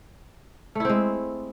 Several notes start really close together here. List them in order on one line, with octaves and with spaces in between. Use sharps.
A3 E4 C4 G#3